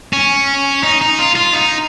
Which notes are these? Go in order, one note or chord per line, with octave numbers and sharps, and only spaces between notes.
C#4
D#4
D#4
F4
F4
D#4